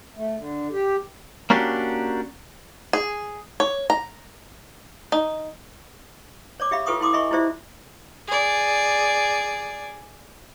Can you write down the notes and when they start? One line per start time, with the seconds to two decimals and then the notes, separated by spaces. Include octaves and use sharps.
0.16 A3
0.37 D3
0.72 G4
1.50 A#3 C#4 D4 F#4 G4
2.93 G#4
3.60 C#5
3.90 A#5
5.12 D#4
6.60 C#5 D5 D6
6.71 G4 E5 F5 B5
6.86 F4 A4 B4 G5 C#6 D#6
7.00 E4 G5 C6 D6 D#6
7.13 D#5 E5 G#5 B5 C#6
7.31 E4 F4 G4 C5 D5 E5
8.27 G#4 D5